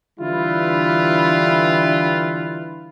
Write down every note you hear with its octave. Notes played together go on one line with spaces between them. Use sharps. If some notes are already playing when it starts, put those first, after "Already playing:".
D3 E3 G3 E4 F4 B4